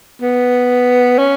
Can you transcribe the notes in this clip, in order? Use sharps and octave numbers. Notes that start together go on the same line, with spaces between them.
B3
C#4